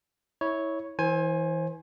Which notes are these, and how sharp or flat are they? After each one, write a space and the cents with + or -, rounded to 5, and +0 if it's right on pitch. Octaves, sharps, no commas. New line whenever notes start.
E4 -20 C#5 +0
E3 -20 C5 +30 G#5 +5